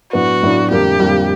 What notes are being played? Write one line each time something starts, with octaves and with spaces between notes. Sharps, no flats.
A2 F#3 B3 D4 F#4
A2 F#3 B3 D4
F2 D3 G3 A#3 G4
F2 D3 G3 A#3